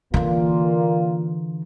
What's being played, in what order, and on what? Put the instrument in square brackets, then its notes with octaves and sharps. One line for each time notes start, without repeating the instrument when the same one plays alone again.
[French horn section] A#2 A#3 F4 [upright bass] D3 E3